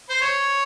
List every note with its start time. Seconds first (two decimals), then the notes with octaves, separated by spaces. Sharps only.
0.10 C5
0.21 C#5